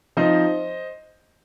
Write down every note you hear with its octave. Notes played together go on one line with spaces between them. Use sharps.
F3 C4 D#4 C5 D#5